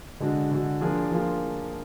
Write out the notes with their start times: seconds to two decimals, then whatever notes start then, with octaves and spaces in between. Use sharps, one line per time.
0.20 D3 G#3 D4 F#4
0.51 D3 G#3 D4 F#4
0.81 F3 A#3 D4 F4 G#4
1.11 F3 A#3 D4 F4 G#4